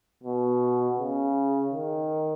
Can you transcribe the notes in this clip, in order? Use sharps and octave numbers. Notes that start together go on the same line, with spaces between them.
B2
C#3
D#3